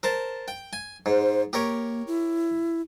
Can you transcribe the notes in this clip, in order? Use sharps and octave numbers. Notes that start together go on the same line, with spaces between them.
A#4 C5 A5
G5
G#5
G#2 C5
A#3 G4 A#4 C#5
E4